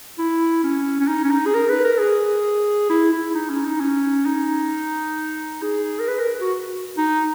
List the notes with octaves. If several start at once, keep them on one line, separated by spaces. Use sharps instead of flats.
E4
C#4
C#4
D#4
C#4
D#4
G#4
A#4
B4
A#4
G#4
E4
E4
D#4
C#4
D#4
C#4
D#4
G#4
A#4
B4
A#4
F#4
D#4